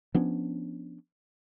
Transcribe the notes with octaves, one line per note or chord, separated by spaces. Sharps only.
F3 B3 C#4 D4